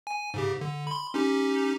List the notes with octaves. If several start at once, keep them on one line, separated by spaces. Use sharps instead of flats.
G#5
G#2 C#3 G4
D3
B5 C6
C#4 D#4 G4